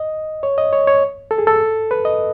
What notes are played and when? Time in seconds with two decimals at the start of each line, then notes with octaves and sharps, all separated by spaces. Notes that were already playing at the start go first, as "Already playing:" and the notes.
Already playing: D#5
0.43 C#5
0.58 D#5
0.73 C#5
0.87 C#5
1.31 A4
1.38 G#4
1.47 A4
1.91 B4
2.05 D#5